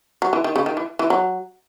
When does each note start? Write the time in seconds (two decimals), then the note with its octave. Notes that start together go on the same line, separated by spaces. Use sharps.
0.22 F#3
0.33 E3
0.44 D#3
0.56 C#3
0.66 D#3
0.77 E3
0.99 E3
1.10 F#3